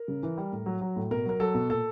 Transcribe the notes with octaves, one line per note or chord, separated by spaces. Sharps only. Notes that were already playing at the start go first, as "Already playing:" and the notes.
Already playing: A#4
C#3
E3
G3
A2
F#3
F#3
A2
B2 A#4
F#3 A#4
F#3 A4
B2
A#2 A4